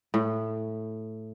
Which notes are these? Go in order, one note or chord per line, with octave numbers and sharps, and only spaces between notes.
A2